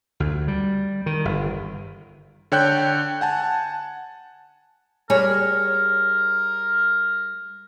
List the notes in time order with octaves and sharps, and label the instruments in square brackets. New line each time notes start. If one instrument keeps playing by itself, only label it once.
[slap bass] D2
G3
D#3
G1
[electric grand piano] D3 C#5 G5 F#6 G6
F#5 G#5 A5
[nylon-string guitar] G3 G#4 C#5 [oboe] A#4